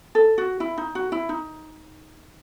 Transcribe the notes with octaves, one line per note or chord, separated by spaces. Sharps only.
A4
F#4
E4
D#4
F#4
E4
D#4